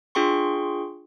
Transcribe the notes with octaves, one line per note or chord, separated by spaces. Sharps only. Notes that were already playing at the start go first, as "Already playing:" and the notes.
D4 F4 G#4 G5 C6 C#6